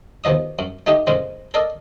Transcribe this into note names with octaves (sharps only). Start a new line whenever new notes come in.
D#2 B2 F3 D#5 D#6
F#2
A3 D#4 G4 D#5
F2 A#2 C#3 G#3
A4 A#4 D5 D#5